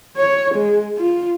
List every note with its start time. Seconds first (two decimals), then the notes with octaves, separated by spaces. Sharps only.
0.17 C#5
0.54 G#3
0.97 F4